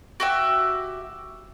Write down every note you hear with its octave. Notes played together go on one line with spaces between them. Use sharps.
F#4 G4 E5